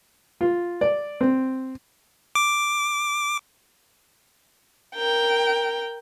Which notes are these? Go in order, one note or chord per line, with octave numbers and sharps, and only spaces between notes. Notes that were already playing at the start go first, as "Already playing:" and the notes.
F4
D5
C4
D6
A#4 G5